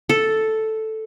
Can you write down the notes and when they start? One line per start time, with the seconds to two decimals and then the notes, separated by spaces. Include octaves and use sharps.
0.09 A4